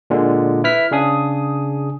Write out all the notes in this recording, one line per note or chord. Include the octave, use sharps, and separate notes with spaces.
A#2 D3 G#3
E4 B4 F6 B6
C#3 D4 G#4 D#6